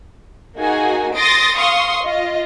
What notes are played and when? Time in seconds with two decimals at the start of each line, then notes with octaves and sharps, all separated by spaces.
0.57 A#3 D#4 F#4 G#4 G#5
1.16 C6 D#6 A6 A#6 D7
1.57 F5 C6 C#6 D#6
2.04 F4 D#5